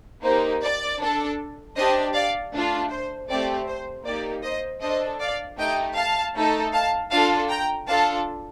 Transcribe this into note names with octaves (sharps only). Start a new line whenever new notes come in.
A#3 D#4 G4 C5
D5
D4 A4
D4 G4 C5 D#5
D5 F5
A3 D4 F4
C5
A3 C4 G4 D5
C5
A#3 D#4 G4 D5
C5 D#5
D4 A4 C5 D#5
D5 F5
A3 D#4 G4 D#5 G5
F5 A5
A3 D#4 A4
F5 A5
D4 F4 A4 F5 A5
G5 A#5
D4 F4 A4 F5 A5